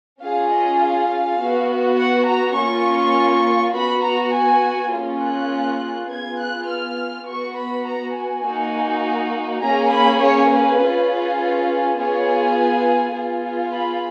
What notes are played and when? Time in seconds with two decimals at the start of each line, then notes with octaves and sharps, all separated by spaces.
0.21 C#4 F4 G#4 F5
0.51 D#5
0.80 F5
1.39 B3 F#4
1.98 F#5
2.28 A#5
2.57 A#3 C#4 F4 C#6
3.75 B3 F#4 B5
4.04 A#5
4.33 G#5
4.92 A#3 C#4 F4 G#4
5.21 F#6
6.10 B3 F4 G#4 G#6
6.39 F#6
6.69 F6
7.27 B3 F#4 C#6
7.57 B5
7.86 A#5
8.16 G#5
8.45 A#3 D#4 F#4
9.63 A#3 C#4 G#4 A#5
9.92 B5
10.22 C#5
10.51 B4
10.80 C#4 F4 G#4
11.39 B4
11.98 B3 F4 G#4 C#5
12.57 B4
13.16 B3 F4 G#4
13.75 B5